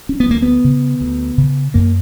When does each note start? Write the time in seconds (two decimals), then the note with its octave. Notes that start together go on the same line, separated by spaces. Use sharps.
0.09 C#4
0.20 B3
0.28 D2 A#3
0.42 B3
0.64 C#3
1.01 D2
1.38 C#3
1.74 F#2 A#3